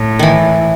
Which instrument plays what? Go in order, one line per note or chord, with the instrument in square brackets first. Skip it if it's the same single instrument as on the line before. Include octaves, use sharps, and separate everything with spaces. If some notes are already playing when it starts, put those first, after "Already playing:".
Already playing: [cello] A2
[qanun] D#3 E3